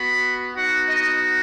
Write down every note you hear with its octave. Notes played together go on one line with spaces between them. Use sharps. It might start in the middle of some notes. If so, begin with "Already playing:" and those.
Already playing: B3 F#4 B5
B3 D#4 F#4 F#5
D#5